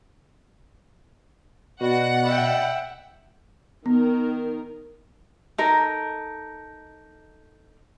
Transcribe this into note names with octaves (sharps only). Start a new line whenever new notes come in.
B2 F#4 D5 D#5 F#5 B5
E5 G5
D#3 B3 A#4
D#4 A4 A#4